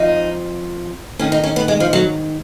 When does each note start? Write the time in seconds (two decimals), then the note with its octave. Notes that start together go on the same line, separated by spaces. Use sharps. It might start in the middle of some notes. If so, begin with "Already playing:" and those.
Already playing: F2 F3 D#4
1.19 G#2 D#3 C#4
1.32 D#4
1.44 C#4
1.56 B3
1.68 G#3
1.80 F3
1.93 F#3